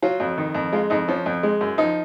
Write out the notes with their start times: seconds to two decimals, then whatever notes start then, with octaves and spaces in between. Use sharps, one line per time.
0.03 F#3 F4
0.20 F2
0.38 D#3
0.54 F2
0.72 G#3 F4
0.90 F2 D#4
1.08 F3 C#4
1.26 F2
1.43 G#3
1.61 F#2
1.78 F3 D#4